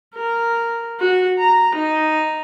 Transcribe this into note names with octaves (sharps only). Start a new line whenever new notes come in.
A#4
F#4
A#5
D#4